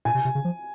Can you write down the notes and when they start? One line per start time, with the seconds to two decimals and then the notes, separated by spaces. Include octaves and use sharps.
0.05 A#2 G#5
0.15 C3
0.25 C3
0.35 C#3
0.45 F3